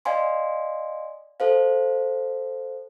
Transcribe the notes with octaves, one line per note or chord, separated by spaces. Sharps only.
D5 D#5 F5 G#5 C6
A4 C5 F5